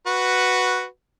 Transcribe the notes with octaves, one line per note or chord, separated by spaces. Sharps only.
F#4 B4